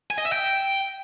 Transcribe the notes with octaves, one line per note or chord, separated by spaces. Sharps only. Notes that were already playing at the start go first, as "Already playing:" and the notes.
G#5
D#5
E5
G5